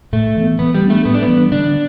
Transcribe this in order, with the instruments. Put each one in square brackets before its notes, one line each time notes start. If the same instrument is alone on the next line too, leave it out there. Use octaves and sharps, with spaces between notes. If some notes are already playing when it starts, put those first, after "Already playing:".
[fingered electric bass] A2 [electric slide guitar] A3
[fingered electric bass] E3 B3
[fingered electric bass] E3 [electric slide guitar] B3
[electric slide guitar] G3
[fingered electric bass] B3
[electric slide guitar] A3 [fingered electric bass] D4
[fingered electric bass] A2 [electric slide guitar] B3
[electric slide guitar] D4
B3
[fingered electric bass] E3 G3 D4
[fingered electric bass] D3 [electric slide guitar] D4